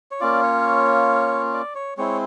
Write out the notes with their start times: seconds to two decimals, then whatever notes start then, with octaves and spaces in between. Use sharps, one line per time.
0.11 C#5
0.20 A#3 C#4 F4 D5
0.43 C#5
1.54 D5
1.75 C#5
1.97 G#3 C4 E4 C#5